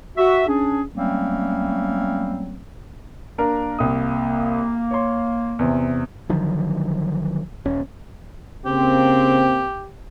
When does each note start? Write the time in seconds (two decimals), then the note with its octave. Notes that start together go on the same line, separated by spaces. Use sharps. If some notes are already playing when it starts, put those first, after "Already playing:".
0.17 F#4 E5
0.47 C#4 D4 G#4
0.94 F#3 G3 A3 A#3 C4 C#4
3.38 A#3 D4 A#4
3.79 C2 A#3 D#6
4.91 C#5 C6
5.59 E2 C3
6.29 D3 D#3 F3 F#3
7.65 D#1 C#4
8.66 C#3 A#3 C4 G4